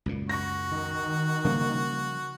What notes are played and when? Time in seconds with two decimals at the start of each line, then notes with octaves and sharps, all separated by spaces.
0.06 C#2 F#2 A#2
0.29 F#4 C#6 A#6
0.71 D#3
1.45 C#3 F3 G3 A#3